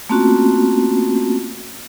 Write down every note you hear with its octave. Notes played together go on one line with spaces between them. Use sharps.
A3 A#3 C4 C#4 F4 F#4